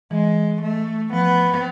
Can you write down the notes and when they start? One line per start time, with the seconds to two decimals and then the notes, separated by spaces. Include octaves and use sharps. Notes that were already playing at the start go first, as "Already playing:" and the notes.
0.11 E3 G#3
0.62 A3
1.13 F3 B3